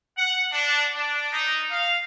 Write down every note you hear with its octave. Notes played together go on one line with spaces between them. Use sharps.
F#5
D4
D4
D#4
F5